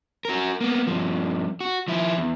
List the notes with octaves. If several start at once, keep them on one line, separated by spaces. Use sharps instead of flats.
F#4 A#4
A#3 B3
G2 F3
F#4
F3 E4
E2